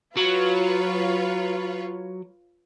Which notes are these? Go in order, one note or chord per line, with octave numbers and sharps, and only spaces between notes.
F#3 F4 B4 C#5